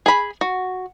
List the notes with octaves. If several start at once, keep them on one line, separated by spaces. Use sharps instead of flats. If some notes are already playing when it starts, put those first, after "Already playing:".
G#4 B5
F#4